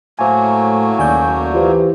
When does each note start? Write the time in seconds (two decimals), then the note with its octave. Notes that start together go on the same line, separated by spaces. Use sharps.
0.19 A2 F#3 A3 A#3 C5 G#5
0.99 F#1 D#2 D5 G#5 G6
1.54 E3 F4 G4 C5